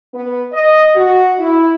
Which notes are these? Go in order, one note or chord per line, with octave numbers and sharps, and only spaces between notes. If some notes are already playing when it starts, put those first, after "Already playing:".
B3
D#5
F#4
E4